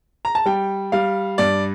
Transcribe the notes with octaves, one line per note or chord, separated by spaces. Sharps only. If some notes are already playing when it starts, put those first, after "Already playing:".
A#5
A5
G3 G5
G3 F5
G2 D5